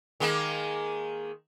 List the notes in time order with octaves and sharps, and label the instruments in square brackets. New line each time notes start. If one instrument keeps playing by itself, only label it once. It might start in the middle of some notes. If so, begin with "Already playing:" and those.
[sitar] D#3 G#3 A#3